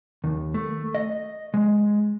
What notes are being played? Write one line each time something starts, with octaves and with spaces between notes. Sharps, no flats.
D#2
A3
D#5
G#3